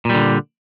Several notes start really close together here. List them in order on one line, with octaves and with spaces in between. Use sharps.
A#2 G3 D3